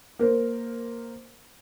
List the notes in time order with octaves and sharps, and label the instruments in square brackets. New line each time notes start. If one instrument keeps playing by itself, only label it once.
[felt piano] A#3 A#4 C5